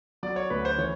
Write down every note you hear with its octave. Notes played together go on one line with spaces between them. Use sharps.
F#3 D5
C#5
D2 B4
C5
E3 C#5